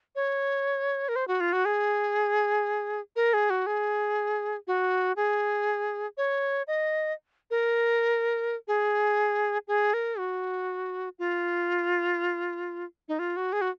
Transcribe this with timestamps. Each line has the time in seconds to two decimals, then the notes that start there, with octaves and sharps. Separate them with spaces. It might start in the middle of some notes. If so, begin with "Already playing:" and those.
0.16 C#5
1.09 A#4
1.16 C5
1.28 F#4
1.40 F4
1.53 F#4
1.65 G#4
3.16 A#4
3.34 G#4
3.50 F#4
3.67 G#4
4.67 F#4
5.16 G#4
6.17 C#5
6.68 D#5
7.51 A#4
8.68 G#4
9.68 G#4
9.94 A#4
10.19 F#4
11.19 F4
13.08 D#4
13.19 F4
13.37 F#4
13.53 G#4
13.61 F#4